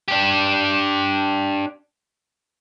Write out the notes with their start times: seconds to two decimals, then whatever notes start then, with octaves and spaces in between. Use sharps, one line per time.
0.08 D4 G4